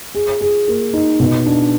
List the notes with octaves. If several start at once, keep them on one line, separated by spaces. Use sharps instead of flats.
G#4
G#4
A#3
D#4
B2
D4